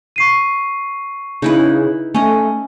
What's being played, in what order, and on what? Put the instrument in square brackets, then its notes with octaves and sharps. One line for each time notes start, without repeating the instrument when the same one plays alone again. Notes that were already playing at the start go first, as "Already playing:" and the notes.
[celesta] C#6 C7 D#7
[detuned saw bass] C#3 [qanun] D#4 E4 B4
[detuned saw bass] A3 [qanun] C#4 D#5